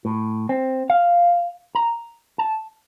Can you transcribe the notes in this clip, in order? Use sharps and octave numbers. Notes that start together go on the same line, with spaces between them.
A2
C4
F5
A#5
A5